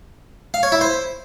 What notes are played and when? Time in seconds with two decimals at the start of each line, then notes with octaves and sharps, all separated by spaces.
0.54 F5
0.63 C#5
0.72 E4
0.81 C5